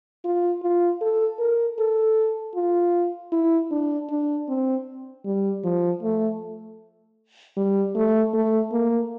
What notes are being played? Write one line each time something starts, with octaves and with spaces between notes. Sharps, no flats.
F4
F4
A4
A#4
A4
F4
E4
D4
D4
C4
G3
F3
A3
G3
A3
A3
A#3